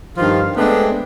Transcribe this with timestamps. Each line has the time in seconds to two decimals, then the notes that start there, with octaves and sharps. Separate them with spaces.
0.18 G2 D#3 F3 F4
0.56 G#3 A3 B3 C4 D4